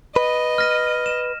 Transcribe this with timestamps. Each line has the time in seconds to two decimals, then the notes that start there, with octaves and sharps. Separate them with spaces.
0.16 B4 D#5
0.58 F6 A#6 D#7
1.06 E7